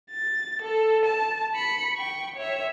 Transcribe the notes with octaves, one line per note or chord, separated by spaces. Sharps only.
A6
A4
A5
B5 C#7
G5 C#6
C#5 E5